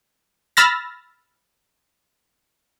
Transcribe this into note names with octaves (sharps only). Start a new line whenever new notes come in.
B5 E6 F6 A6 A#6